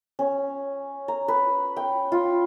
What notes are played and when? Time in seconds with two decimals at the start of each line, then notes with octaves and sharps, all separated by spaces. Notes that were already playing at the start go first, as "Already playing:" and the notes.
0.19 C#4
1.08 A#5
1.28 B4
1.77 G5
2.12 F4